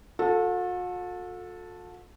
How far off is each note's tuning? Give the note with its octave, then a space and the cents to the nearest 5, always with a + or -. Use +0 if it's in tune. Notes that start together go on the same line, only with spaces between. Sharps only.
F#4 -45 A4 +0